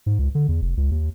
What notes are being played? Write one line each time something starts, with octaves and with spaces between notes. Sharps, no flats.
G#2
C#2
D3
E2
F1
C#2
D#2